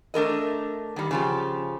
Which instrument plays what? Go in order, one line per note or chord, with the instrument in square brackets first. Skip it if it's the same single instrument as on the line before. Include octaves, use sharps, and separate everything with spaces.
[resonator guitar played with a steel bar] A3 D4 A#4 D#5
D#3 G3
C#3 F3 G4